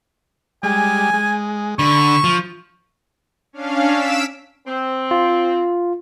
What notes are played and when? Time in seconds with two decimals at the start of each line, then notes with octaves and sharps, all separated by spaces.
0.63 G3 G#3 G#5
1.14 G#3
1.79 D3 B5 C#6
2.24 F3
3.53 C#4 D4 F5
3.90 E6 B6 D7 E7
4.66 C4
5.11 F4